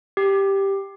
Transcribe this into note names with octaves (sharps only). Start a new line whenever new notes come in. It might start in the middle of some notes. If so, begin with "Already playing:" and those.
G4